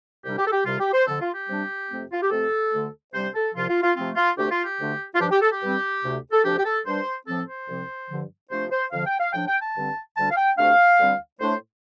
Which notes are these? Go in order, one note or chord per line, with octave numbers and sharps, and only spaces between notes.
C2 C3 G3 D4 G4
G4
A4
G4
C2 C3 G3 F4
G4
C5
F2 D3 F3 A4
F4
G4
C3 G3 D4
F2 C3 A3 C4
F4
G4
F2 C3 A3 C4 A4
D2 D3 A3
C3 G3 D4 C5
A4
C2 C3 F3 F4
F4
F4
C3 F3 A3 C4 F4
F4
D2 C3 A3 D4 G4
F4
G4
D2 D3 A3 D4
F4
G2 F3 D4 G4
G4
A4
G4
G2 G3 C4
D2 C3 A3
A4
D2 C3 F3 D4 G4
G4
A4
G2 G3 D4 C5
A2 F3 C4 A4
C5
C2 C3 F3 C4
G2 D3 F3
C3 F3 A3 D4 C5
C5
F2 D3 F3 F5
G5
F5
A2 F3 D4 G5
G5
A5
G2 D3 G3 C4
D2 D3 G3 D4 A5
F5
G5
D2 C3 A3 D4 F5
D2 D3 G3 C4
A2 A3 D4 C5